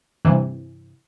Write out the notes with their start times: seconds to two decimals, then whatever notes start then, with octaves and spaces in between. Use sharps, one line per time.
0.25 G2 C3 E3